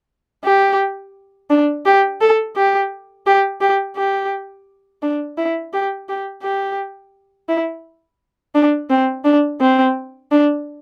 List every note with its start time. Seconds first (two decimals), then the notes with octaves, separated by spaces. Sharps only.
0.44 G4
1.50 D4
1.86 G4
2.21 A4
2.56 G4
3.27 G4
3.61 G4
3.96 G4
5.02 D4
5.38 E4
5.73 G4
6.09 G4
6.43 G4
7.49 E4
8.55 D4
8.90 C4
9.24 D4
9.61 C4
10.31 D4